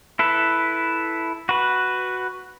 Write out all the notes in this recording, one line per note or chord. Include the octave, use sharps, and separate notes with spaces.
E4 A4 B4
F#4 B4